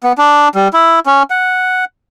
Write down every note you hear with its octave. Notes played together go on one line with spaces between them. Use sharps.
B3
D4
G3
E4
C#4
F#5